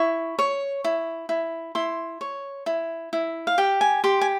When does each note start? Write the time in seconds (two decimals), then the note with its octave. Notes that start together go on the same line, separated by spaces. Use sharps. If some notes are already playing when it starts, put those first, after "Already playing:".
Already playing: E4 C#6
0.39 C#5
0.84 E4
1.29 E4
1.75 E4 C6
2.21 C#5
2.66 E4
3.13 E4
3.47 F5
3.58 G4 G5
3.81 G#5
4.04 G4 C6
4.21 G#5